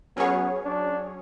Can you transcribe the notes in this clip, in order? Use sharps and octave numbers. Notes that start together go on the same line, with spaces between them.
F#3 B3 C#4 G#4 C#5
D4